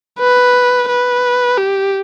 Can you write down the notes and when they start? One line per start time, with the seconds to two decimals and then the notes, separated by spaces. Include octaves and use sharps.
0.19 B4
0.89 B4
1.58 G4